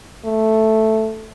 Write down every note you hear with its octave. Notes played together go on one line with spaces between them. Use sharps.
A3